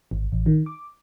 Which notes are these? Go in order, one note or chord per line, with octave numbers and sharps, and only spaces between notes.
G#1
A1
D#3
D6